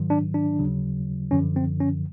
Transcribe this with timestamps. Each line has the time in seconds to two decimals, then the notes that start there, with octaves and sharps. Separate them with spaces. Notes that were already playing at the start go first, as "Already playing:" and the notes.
Already playing: G#2 D#3 F#3
0.10 D4
0.34 D4
0.59 D#2 C#3 F#3
1.31 F#2 D3 F3 C#4
1.56 C4
1.80 C#4